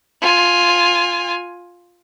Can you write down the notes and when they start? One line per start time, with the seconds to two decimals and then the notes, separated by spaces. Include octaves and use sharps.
0.22 F4 G#5